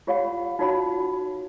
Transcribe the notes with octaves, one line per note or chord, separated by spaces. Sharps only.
F4 G4 C#5 F5 F#5 B5
D#4 F4 F#4 C#5 F#5 B5